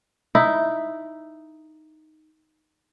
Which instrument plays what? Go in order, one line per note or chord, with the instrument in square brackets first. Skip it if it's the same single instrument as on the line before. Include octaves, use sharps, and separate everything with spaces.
[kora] D#4 E4